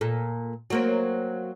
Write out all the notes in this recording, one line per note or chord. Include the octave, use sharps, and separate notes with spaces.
A#2 A4
F#3 A#3 C4